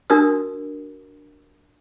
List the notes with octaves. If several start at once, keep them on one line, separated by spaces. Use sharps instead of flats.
D4 F#4 A#4 D#6